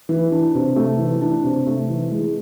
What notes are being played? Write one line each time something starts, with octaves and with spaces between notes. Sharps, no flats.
E3
D4
C3
A3
E3
D4
C3
A3
E3
G#3